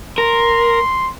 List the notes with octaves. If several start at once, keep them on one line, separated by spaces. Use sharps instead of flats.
A#4 C6